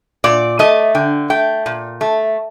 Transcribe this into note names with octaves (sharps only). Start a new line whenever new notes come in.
A#2 D5
A3 D#5
D3 G5
A3 G5
A#2
A3